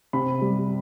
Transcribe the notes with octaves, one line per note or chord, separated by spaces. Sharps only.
C3 B5
G3